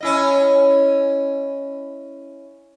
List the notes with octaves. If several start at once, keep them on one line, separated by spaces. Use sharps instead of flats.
C#4 E4 D#5